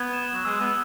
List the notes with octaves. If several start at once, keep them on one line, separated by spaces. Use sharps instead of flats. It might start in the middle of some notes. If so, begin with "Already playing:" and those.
Already playing: B3 G#6
E7
F#3
G#3 E6
B3